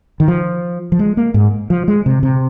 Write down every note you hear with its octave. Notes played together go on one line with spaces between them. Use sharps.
D#3
F3
F3
G#3
A#3
G#2
F3
G#3
C3
C3